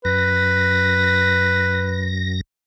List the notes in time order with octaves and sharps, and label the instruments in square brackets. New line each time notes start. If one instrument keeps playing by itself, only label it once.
[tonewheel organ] F#2 A#6 [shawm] B4